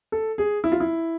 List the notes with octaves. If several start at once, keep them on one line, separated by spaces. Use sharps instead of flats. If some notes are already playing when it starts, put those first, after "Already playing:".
A4
G#4
E4
F4
E4